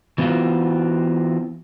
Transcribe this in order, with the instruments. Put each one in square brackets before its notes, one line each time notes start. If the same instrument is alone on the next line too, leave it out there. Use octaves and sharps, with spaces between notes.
[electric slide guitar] E3 B3 C4 F4 F#4